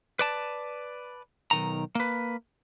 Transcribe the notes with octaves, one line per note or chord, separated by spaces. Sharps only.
B4 D5 A5
B1 D#3 A#5
A#3 B4